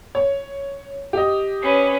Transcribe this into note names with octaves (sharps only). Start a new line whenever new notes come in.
C#5
G4 D#5
C#4 B4